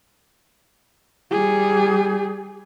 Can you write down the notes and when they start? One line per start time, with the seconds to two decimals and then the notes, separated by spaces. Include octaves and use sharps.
1.32 G3 G#4